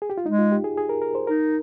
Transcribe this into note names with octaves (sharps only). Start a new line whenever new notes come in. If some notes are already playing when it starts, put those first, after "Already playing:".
G#4
G4
F4
G#3 D#4
F4
G4
G#4
G#4
A#4
A#4
C5
D#4 A#4